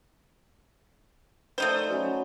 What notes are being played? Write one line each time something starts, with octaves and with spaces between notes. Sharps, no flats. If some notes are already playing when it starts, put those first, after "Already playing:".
A3 D#4 C5 D5
F#3 C#4 B5